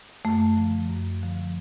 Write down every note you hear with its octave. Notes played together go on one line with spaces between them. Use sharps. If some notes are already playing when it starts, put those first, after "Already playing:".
F#2 A3
D3 F3
F#2
D3 F3